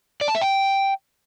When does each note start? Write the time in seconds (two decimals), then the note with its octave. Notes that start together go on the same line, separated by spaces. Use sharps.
0.21 D5
0.28 A5
0.35 E5
0.42 G5